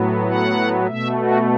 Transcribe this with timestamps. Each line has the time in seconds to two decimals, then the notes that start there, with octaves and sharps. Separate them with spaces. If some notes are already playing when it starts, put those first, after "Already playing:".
Already playing: A2 F#3 B3
0.28 F#5
0.87 B2 A3 E5
1.17 F#4